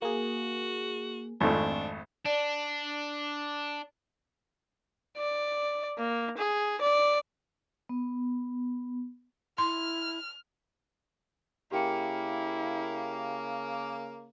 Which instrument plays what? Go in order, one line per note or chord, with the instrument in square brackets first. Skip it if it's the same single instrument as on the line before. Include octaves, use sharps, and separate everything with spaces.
[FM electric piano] A#3 G#4 [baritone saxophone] F#4
[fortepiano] G#1 F2 A3 [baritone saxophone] D4
[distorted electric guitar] D4 [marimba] D5
[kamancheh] D5
A#3
G#4
D5
[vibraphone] B3
[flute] E4 [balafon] C6 [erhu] F6
[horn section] C#3 A#3 [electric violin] E4 [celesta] G4 G5 C#7